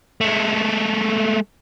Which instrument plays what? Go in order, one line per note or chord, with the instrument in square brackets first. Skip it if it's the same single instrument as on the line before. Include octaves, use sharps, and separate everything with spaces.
[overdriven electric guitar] G#3 A3